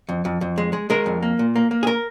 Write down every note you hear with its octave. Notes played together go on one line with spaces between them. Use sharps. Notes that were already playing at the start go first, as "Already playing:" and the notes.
F2
F2
F2
G#3
G#3
G#3 A#4
F2
A#3
A#2
A#3
A#3
G#4
A#4